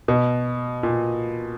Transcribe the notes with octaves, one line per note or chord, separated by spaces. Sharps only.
B2
A#2